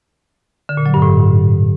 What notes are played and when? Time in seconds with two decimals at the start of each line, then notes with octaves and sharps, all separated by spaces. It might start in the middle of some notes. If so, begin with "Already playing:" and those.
0.69 D3
0.77 A#2
0.86 F#3
0.94 G2
1.02 A2